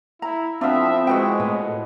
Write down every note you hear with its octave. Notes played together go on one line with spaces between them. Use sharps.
E4 A#5
F3 B3 C4 D4 E4 F4 E5
B2 G#3 E4 B4 G5 C#6
A2 B4